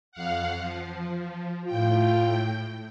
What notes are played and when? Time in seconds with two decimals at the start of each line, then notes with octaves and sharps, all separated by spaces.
0.12 F2 F5 F#5
0.57 F3
1.65 A2 F4 G5